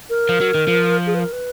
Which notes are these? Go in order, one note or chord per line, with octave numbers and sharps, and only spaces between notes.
A#4
F3
F#3
D#3
F3
G#4
B4
A#4
B4